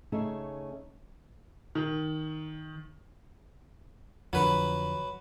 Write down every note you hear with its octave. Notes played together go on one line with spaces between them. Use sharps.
C#3 A3 C#4 D#4 G#4 E5
D#3
F2 D3 F#3 B4